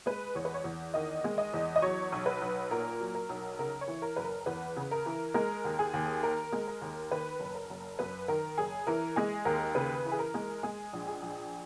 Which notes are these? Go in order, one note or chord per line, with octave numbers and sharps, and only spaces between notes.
G#3 B4
E2 C#5
B4
C#5
E2
D#3 D#5
G#3
D#5
E2
D#5
F#3 C#5
B1
B4
B1
A#2 A#4
F#3
A#4
B1
C#3 A#4
C#5
E3
A#4
F#1 B4
A#4
E2 B4
C#3
A#4
E3
G#3 A#4
D#2
G#4
D#2
D#3 A#4
G#3
A#4
D#2
D#3 B4
F#1
A#4
F#1
F#2 B4
D#3 A#4
F#1 G#4
E3 A#4
G#3 G#4
D#2 A#4
C#3 B4
E3
G#4
A#4
G#3
G#3 G#4
A#1
G#4
A#1